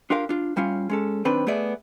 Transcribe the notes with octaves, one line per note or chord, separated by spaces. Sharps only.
D4 F4 G4 A#4 F5
D4 F4
A2 G3 C#4 F4 F5
G#3 C#4 A4
B1 D#3 C4 D4 B4
A3 B3 G#4 D5 E5